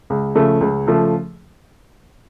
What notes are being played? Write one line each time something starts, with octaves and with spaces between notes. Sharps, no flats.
C#2
C#3 F3 A3
C#2
C#3 F3 A3